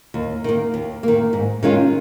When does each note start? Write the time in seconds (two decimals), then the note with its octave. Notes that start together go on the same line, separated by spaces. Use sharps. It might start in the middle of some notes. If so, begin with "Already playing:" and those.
0.14 D#2
0.44 D#3 A#3
0.74 D#2
1.03 D#3 A#3
1.33 G#2
1.63 D#3 G#3 C#4 F4